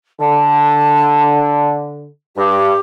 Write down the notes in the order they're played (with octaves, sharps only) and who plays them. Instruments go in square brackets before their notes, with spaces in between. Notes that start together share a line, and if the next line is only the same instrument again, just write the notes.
[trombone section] D3 [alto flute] A5
[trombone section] G2 [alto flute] G4